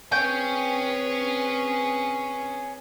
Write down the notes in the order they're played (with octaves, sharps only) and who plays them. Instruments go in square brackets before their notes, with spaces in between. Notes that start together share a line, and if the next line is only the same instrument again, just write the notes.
[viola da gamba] C4 G#4 B4 [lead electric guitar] C#5 G#5 [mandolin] G5